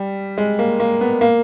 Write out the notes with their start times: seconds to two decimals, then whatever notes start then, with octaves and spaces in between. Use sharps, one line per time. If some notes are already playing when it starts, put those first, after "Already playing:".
Already playing: G3
0.38 G#3
0.59 A#3
0.80 A#3
1.01 B3
1.21 A#3